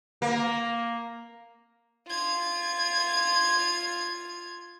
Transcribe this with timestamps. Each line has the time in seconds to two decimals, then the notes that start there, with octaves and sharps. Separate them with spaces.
0.22 A#3
2.08 F4 G#6